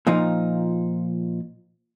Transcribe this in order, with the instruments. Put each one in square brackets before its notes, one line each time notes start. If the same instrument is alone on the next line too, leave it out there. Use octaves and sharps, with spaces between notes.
[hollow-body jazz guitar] A#2 F3 D#4